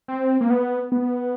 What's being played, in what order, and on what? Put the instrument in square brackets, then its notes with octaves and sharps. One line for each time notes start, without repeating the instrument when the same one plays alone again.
[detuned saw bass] C4
A#3
B3
B3